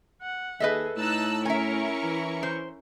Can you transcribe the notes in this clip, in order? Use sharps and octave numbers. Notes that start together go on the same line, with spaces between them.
F#5
D#2 G#4 A4 B4 D#5 E5
A2 D#4 A5 E6 F#6
C#4 E4 A#4 E5 G#5 C#6
E3
C5